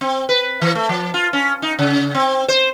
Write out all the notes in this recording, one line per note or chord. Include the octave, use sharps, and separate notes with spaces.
C4
B4
E3
A3
F3
F4
C#4
D#4
C#3
C4
C5